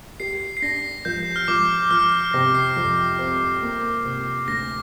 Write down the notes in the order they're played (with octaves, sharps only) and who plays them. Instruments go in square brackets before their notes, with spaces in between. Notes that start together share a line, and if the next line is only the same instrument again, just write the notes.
[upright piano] G4 [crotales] C7
[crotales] C7
[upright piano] D4 [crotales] A#6
[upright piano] F3 [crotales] G6
[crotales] F6
[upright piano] F3 [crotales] D6
[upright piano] F3 [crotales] F6
[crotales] F6
[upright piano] C3 [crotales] A#6
[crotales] C7
[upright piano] F2
C4
A#3
C3
[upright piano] D2 [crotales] A#6